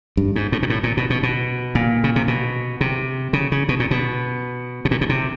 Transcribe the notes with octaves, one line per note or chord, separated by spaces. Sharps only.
G2
G#2
A2
A#2
A2
A#2
B2
B2
B2
A#2
C#3
C3
B2
C3
C#3
C#3
B2
A#2
B2
B2
A#2
B2
C3